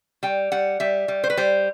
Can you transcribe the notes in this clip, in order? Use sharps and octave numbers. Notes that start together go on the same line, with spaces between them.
G3 G5
G3 F#5
G3 E5
G3
C5
B4
G3 C5